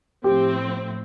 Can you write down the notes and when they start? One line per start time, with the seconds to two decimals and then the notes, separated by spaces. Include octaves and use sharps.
0.24 A2 F3 C4 G4